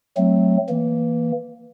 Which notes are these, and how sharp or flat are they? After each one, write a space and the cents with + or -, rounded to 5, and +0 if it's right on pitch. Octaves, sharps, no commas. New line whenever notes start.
F#3 +0 A3 -5 C4 +0
E3 +0 A#3 +0